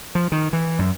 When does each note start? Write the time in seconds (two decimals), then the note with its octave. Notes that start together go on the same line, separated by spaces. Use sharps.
0.15 F3
0.32 D#3
0.53 E3
0.79 F#2